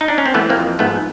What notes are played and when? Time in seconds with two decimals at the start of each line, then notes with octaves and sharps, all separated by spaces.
0.01 D#4
0.08 D4
0.18 C#4
0.26 C4
0.34 E3 A3 B3
0.49 A#3 C4
0.57 F2
0.79 G#2 A3 B3